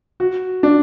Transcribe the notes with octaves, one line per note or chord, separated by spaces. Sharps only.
F#4
D4